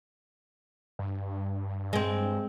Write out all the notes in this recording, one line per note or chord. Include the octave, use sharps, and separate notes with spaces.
G2
G#3 C4